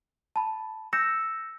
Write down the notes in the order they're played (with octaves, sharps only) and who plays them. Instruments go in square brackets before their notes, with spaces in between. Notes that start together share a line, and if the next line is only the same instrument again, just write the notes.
[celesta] A5 B5
[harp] E6 [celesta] G6 A#6 C#7